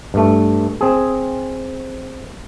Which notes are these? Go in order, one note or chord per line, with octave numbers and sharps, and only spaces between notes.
G2 A3
C4 G#4